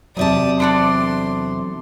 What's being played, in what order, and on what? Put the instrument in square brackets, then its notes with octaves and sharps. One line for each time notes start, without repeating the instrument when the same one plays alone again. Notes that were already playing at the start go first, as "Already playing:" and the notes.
[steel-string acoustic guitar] E2 C3 A5 [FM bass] F#3 [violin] D5 D#6
[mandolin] D4 A4 D5 [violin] C6